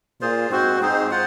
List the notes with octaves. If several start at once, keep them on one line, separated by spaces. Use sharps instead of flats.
A#2 F4 G#4 C5
G#2 C4 F#4 C5
G#2 C4 D#4 G#4 C5
F4 C5 F#5